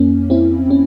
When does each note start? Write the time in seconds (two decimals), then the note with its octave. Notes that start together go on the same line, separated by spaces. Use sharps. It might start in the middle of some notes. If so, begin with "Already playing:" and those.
Already playing: F2 A#3 C#4
0.30 C4 E4
0.70 C#4